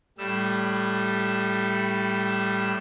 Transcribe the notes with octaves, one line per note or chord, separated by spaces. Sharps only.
A2 G3 E6